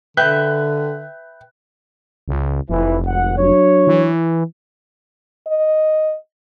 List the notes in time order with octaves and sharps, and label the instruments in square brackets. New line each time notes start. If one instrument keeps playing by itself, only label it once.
[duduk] D3 [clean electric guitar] B4 E5 G5 [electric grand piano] F#6
[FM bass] C#2
[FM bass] F1 [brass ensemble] E3
[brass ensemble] G#1 F#5
F#3 D4 C#5
[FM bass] E3
[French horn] D#5